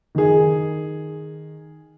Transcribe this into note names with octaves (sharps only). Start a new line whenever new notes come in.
D#3 G#4